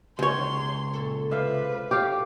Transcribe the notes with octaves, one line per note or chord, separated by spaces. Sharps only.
C#2 C#5 C6
A#2 A4
C3 F4 B4 E5 F5
G4 A4 F5